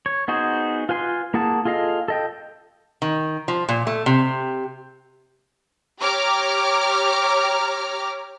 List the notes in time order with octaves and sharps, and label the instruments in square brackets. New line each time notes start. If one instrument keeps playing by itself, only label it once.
[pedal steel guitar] C#5
B3 D#4 F#4 G#4 C5
F4 B4 G#5 C6
A#3 E4 G#4 F#5 A5
F4 G#4 A4 D#5 F5
A4 D#5 G5
[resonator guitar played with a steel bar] D#3
F3
A#2
A3
C3
[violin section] G4 C#5 A#5 D6 F6